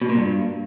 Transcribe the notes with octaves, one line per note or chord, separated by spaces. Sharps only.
B2
A#2
G2